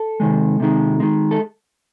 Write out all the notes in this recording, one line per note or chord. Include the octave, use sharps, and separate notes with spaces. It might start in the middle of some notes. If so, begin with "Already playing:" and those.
Already playing: A4
C3 D#3 G#3
C3 D#3 G#3
D#3 G#3
A4